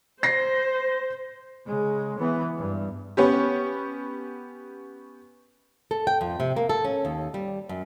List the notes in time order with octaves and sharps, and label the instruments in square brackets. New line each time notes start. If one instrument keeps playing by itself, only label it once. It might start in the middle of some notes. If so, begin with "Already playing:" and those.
[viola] C5 [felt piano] A#6 C7
[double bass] C#3 G#3
E3 B3
G2
[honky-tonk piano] B3 C#4 G4
[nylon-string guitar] A4
G5
F2
C3
A#3
A4
C#4
D#2
G3
F#2